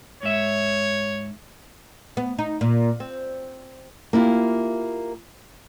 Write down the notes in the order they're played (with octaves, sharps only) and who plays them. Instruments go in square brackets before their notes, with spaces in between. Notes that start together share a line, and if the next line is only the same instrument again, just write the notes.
[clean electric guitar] G#2 E5 [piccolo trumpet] C#5
[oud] B3
D#4
A#2
C4
[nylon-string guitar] A#3 E4 F4 G4